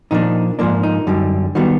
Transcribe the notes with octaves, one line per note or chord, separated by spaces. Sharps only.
A#2 F3 A#3 D4 D#4
G#2 F3 A#3 D4
D#4
F#2 D3 G3
D#3 G3 B3 F#4